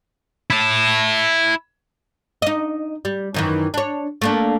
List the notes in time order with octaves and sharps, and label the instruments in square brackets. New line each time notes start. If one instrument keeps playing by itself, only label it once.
[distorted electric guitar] E4 A5
[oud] D#4 D#5
G3
F#2 D#3 E3
D4 C#5
A3 A#3 D4